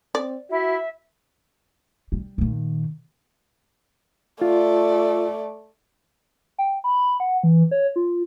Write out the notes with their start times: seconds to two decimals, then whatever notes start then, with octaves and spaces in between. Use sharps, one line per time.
0.15 C4 D5
0.50 E4 F#4 E5
2.12 G3
2.38 A#2 D#3
4.42 A3 F4 D5
6.58 G5
6.84 B5
7.20 F#5
7.44 E3
7.71 C#5
7.96 F4